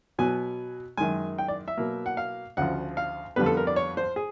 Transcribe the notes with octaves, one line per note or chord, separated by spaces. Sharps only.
B2 F#3 B3 G#5
F#2 D#3 G#3 G#5
G5
D5
E5
B2 F#3 A#3
F#5
F5
D2 C#3 F3 F#5
F5
F2 D3 G3 B3 B4
A4
A#4
D5
C#5
C5
G#4